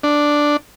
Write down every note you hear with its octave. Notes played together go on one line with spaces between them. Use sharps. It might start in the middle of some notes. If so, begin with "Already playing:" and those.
D4